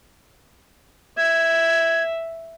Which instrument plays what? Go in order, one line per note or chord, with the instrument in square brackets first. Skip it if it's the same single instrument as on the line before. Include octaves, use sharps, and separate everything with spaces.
[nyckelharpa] E5 [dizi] G#6